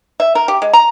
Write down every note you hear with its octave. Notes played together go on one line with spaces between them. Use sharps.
E5
A#4
G4
G#3
A#5